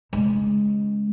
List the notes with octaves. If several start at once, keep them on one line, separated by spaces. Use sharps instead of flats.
C#3 G#3